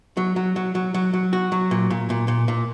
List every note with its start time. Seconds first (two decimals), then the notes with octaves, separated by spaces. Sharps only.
0.17 F#3
0.36 F#3
0.56 F#3
0.75 F#3
0.94 F#3
1.14 F#3
1.33 F#4
1.52 F#3
1.71 A#2
1.90 A#2
2.10 A#2
2.28 A#2
2.48 A#2